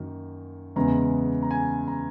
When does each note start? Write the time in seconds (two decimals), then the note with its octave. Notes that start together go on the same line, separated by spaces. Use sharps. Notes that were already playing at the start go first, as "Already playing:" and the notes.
Already playing: F#2 D#3 A#3
0.76 E2 C#3 G#3 B3 A#5
1.43 A#5
1.51 G#5
1.88 A#5